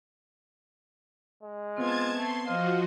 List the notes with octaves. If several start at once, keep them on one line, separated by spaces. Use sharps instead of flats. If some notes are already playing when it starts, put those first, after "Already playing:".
G#3
B3 C4 F4 A5 G#6
A3 C6
F3 F#4 C5 D#5 F5